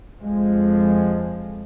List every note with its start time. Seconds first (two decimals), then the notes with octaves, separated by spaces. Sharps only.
0.23 F2 F3 G#3